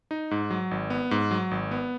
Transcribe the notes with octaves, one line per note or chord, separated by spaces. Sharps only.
D#4
G#2
F#3
G#1
B3
G#2
F#3
G#1
B3